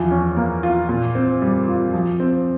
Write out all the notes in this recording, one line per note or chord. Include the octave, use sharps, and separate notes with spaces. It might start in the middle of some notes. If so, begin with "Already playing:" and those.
Already playing: E2 F3
C#4
A#3
F4
A#2
C4
G3
F4
F3
C4